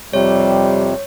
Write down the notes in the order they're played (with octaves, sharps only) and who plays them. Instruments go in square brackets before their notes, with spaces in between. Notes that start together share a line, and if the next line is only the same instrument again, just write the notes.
[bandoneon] F2 C3 [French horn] G3 [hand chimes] C#5